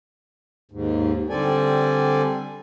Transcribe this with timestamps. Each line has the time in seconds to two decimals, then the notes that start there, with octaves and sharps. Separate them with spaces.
0.72 D#2 G#2
1.30 D3 G3 C4 A4 D5 G#5